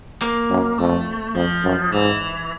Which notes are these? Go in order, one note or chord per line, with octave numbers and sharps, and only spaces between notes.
A#3
F#2
F2 A3
F2 F3
F#2
G#2 E3